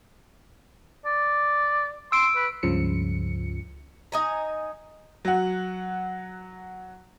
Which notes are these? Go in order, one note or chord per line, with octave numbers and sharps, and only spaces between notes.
D5
C6 E6 D7
B4
C#2 G2 C#3 F3 C#7
D#4 G#5 A#5
F#3 F#5